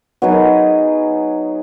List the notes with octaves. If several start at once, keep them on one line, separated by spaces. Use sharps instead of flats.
F#3 B3 D#4 G#4